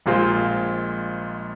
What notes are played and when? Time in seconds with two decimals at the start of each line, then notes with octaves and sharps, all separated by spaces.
0.06 A#1 A#2 G#3 F4 C5